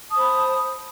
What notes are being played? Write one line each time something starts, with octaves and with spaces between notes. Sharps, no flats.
C5 A5 B5 D#6